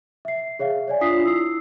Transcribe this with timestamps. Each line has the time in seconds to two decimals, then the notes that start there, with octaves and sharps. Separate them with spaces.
0.25 E5 C7
0.59 G#4 C#5 E5 F5
0.88 C#5 D5 G#5
1.01 D4 F4 D#6 B6 C7
1.24 E4 E6 C7